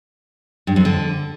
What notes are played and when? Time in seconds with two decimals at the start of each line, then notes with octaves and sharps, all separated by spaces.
0.67 G2
0.76 F2
0.85 D3